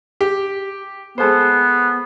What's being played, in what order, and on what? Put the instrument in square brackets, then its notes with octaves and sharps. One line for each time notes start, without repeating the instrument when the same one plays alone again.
[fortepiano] G4
[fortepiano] G#3 A4 C5 [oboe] B3